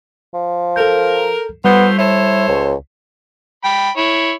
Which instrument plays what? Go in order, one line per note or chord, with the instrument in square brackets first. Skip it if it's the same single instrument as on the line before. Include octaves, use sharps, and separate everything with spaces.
[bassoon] F3
[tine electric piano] A4 G6 [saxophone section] A#4
[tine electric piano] G3 [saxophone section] A3 F4 C5 [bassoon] B3
[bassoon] E4 [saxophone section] A4 C5 C#5
[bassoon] C#2
[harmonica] G5 B5
E4 C#5